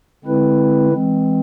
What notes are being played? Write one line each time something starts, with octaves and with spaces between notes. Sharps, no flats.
D3 G#3 C4 E4 B4
E3 G#3 C4